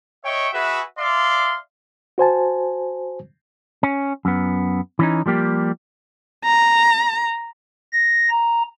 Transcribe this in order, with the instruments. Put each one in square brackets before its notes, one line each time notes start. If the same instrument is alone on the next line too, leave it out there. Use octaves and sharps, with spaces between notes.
[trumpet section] C#5 D#5 E5 G5 C#6
F#4 G#4 B4 E5
D5 E5 F5 C6
[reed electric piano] F#4 C5 G#5 A5
[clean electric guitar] C#4
F#2 B3
E3 C#4 D#4
F3 G3 A#3 G4
[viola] A#5
[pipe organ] A#6
A#5